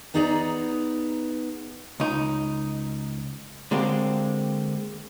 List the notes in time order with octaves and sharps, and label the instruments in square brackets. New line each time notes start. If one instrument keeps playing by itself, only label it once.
[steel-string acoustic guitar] B3 D#4 G#4 D5 G#5 A#5
[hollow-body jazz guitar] C#2 D#4
D3 G#3 A#3 C4 F#4 G4